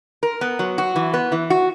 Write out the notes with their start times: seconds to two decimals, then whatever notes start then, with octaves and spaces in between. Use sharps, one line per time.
0.23 A#4
0.41 B3
0.59 F#3
0.78 F#4
0.96 E3
1.14 B3
1.32 E3
1.50 F#4